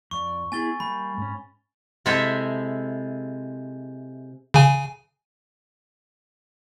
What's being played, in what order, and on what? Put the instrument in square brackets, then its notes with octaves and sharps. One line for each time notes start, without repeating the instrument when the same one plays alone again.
[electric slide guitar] F2 D5 [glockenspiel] C#6
[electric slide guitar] B3 E4 G#4 [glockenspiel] G#5 A6 G7
[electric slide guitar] G3 A#3 [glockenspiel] B5
[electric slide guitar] G#2 C#4
[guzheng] C3 G#3 E4 A4 E5 G5
[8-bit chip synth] C#3 G#5